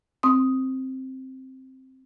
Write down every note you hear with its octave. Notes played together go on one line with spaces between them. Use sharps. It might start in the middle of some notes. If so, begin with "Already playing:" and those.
C4 D#6